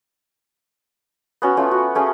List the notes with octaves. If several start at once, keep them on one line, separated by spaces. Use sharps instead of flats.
B3 C#4 F#4
A3 C#4 F4
F#4
A3 C#4 G#4